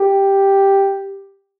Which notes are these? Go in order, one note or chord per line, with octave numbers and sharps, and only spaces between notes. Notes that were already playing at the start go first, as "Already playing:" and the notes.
Already playing: G4